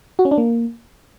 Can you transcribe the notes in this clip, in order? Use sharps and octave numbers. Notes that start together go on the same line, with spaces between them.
F#4
C#4
D4
A#3